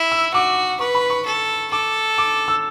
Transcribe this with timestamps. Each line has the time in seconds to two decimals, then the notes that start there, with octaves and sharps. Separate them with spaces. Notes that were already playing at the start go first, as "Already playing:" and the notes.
Already playing: E4
0.12 E6
0.34 F#4 D6
0.80 B4 C#6
0.95 B5
1.10 C#6
1.25 A4
1.71 A4 D6
2.18 D6
2.48 E6